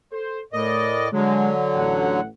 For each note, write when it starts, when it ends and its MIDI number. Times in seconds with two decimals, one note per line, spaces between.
0.12 0.39 69
0.12 0.39 72
0.53 1.09 45
0.53 1.08 57
0.53 1.08 70
0.53 1.08 74
0.53 1.09 75
1.13 2.20 50
1.13 2.20 54
1.13 1.51 56
1.75 2.26 33
1.75 2.26 78